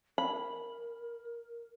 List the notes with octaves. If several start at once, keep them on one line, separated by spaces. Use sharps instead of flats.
A#4 B5